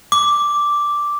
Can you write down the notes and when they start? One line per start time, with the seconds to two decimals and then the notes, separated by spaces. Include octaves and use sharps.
0.12 D6